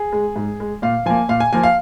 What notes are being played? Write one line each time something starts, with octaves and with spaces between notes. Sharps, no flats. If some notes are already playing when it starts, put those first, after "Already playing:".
Already playing: G#4
G#3
G#2
G#3
A#2 F5
F3 A#3 G#5
A#2 F5
G#5
F3 A#3 G#5
F5